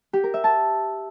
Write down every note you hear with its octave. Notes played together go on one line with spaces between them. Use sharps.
G4
A#4
E5
A5